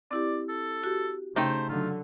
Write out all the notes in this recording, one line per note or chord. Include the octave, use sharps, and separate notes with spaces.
C4 E4 G4 D5
A4
F#4 G4
C#3 A3 D#4 C5 G5
D3 F#3 F4